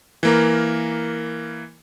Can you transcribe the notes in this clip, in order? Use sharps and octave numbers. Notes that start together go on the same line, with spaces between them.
E3 A#3 A#4